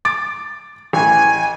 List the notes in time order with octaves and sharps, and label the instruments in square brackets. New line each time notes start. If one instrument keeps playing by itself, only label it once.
[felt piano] D6 A6 D7
[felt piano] A1 [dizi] G#5